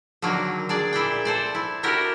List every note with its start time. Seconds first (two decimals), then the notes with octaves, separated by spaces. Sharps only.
0.22 D3 D#3 F#3 A#3
0.69 D4 G#4 D5
0.93 A#2 E4 D5 G5
1.25 A4 C5 D5
1.55 E4
1.83 D4 E4 F#4 G4 A#4